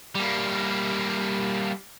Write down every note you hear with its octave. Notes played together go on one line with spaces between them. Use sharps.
G3 A#3